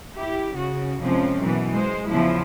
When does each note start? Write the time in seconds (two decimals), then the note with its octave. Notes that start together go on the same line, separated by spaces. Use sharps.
0.14 E4 G4
0.54 C#3 F#4
1.01 F2 C3 F3 G#3 C4 C#4
1.41 F#2 B2 E3
1.73 G#3 C5
2.08 E2 C#3 F3 E4